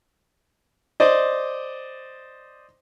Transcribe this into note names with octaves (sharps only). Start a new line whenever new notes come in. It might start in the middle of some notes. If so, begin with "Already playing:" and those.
C5 D5 D#5